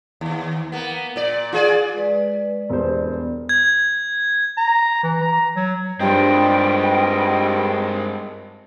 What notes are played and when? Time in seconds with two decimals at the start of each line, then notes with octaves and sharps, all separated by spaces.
0.21 D#2
0.72 A#3 B3
1.16 A#2 D5
1.52 F4 G#4 D5
1.94 G#3 B4 D5
2.70 E1 G3 C5
3.49 G#6
4.57 A#5
5.03 E3
5.21 A#5
5.56 F#3
6.00 G2 G3 G#3 C4 F4 D#5 G5